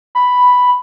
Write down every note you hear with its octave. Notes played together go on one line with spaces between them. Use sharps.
B5